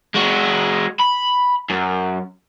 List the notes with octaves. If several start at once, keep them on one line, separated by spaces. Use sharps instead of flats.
G#3 F#4
B5
F#2